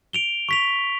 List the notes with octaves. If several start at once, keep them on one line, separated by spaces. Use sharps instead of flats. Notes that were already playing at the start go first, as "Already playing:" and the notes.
D7 F7 G7
C#6 B6 F7